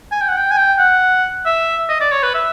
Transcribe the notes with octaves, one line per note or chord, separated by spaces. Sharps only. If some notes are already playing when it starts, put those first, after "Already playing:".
G#5
G5
F#5
G5
G#5
G5
F#5
E5
D#5
D5
C#5
B4
E5